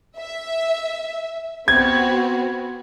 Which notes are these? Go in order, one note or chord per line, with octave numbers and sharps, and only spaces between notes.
E5
B3 C4 F#4 G#6